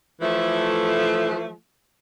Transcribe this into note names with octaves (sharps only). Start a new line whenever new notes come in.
E3 F3 A3